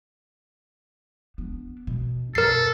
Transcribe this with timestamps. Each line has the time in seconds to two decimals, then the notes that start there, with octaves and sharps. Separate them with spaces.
1.38 B3 D4
1.87 B2
2.35 F#2 B2 A4 A#4 C7